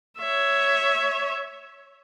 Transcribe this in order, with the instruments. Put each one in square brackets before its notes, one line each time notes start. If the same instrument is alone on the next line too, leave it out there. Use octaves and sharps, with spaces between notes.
[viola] C#5 E5